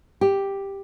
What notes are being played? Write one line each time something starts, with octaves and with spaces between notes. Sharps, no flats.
G4